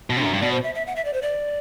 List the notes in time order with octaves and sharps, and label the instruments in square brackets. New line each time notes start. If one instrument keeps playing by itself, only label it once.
[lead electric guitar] B2
[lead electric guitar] C3 [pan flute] D4
[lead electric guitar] F#2
G2
[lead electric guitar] B2 [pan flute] D5
[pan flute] C5
E5
E5
F#5
E5
D5
C5
D5